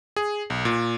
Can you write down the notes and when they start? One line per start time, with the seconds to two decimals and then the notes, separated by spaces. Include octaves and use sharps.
0.16 G#4
0.50 B1
0.65 A#2